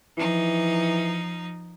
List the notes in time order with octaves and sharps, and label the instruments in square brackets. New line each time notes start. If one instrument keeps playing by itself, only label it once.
[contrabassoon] E3 [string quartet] F3 D#4